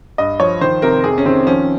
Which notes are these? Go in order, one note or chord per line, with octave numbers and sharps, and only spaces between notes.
G2 D#5
F3 C#5
D#3 C5
C3 A#4
F2 G#4
C#4
D#3 C4
F3 C#4